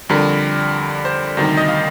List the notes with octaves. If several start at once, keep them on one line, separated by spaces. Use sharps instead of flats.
F2 D3 G3 A#4
C5
D2 C3 D#3 G3
D#5
F5